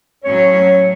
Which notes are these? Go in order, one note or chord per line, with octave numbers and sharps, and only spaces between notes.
A2 F#3 C#4 C#5